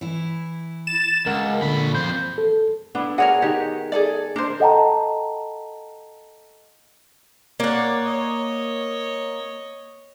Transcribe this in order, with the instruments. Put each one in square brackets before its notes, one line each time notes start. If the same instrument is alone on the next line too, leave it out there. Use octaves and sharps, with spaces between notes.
[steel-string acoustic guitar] E3 E4
[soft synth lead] A6 [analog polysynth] E7
[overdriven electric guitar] C#2 [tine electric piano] A#4 F#5
[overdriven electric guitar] A#2 B5 [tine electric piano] D3
[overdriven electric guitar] F2 C5 [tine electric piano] G6
[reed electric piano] A4
[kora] B3 E4 [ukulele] D4
[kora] F#4 G#4 D5 [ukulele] A#4 C#5 F#5
[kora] D#3 F#5 [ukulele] G4
[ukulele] G#4 A4 D5
[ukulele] D4 C5 [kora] A#4
[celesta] A4 D#5 F#5 G5 A5 A#5
[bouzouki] A#3 F#5 [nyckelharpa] C#5 D5
[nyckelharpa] C#5 D#5